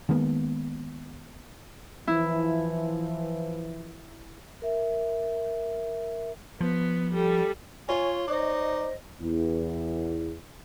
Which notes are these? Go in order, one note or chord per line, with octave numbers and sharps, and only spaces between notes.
D#3 G#3 A#3 B3
E3 F3 E4
A#4 E5
F3 B3
G3 A4
F4 C#5 G#5
D#4 C5 D5 D#5
E2